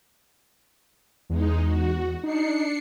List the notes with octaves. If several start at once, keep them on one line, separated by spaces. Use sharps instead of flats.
E2 G#3 D#4
F#4
D4 D#4 C7 C#7